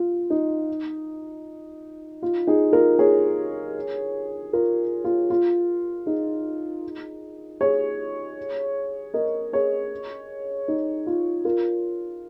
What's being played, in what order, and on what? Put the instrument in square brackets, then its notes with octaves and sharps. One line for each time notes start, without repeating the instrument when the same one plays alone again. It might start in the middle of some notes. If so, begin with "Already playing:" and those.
Already playing: [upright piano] F4
D#4
F4
D#4 G#4
F4 A#4
G#4 C#5
F4 A#4
F4
F4
D#4 G#4
G#4 C#5
A#4 D#5
G#4 C#5
D#4
F4
F4 A#4